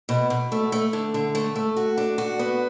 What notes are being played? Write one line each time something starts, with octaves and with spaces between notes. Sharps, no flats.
B2
B2
A3
A3
D3
D3
A3
A3
F#4
D4
F#4
B3